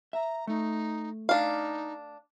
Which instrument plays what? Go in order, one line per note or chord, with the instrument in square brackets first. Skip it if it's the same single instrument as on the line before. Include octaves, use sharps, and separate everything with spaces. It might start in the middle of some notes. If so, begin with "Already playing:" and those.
[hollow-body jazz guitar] E5 [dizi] A#5
[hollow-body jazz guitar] A3 [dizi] D#4
[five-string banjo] D4 F5 [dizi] D#4